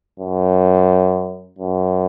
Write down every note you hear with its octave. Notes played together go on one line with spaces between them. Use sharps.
F#2
F#2